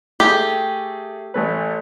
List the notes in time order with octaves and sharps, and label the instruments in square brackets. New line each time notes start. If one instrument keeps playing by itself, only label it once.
[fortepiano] A3 G#4 [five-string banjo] G4
[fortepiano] A1 A3 B4